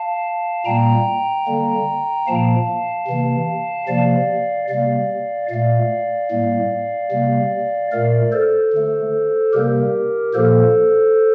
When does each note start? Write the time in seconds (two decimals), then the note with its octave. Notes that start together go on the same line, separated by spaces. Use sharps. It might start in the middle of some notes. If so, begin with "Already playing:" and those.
Already playing: F5 A5
0.65 A#2 G3 A#3 G5 A#5
1.46 D3 G3 A#3
2.26 A#2 F3 A#3 F5 A5
3.08 C3 E3 A#3
3.88 C3 F3 A#3 D5 F5
4.69 C3 G3 A#3 D5 F5
5.50 A#2 A3 D5 F5
6.30 A2 G3 A#3
7.11 C3 G3 A#3
7.92 A#2 A3 A#4 D5
8.32 A4 C5
8.73 D3 A3
9.53 C3 G3 A#3 G4 A#4
10.34 A#2 F3 A#3 A4 C5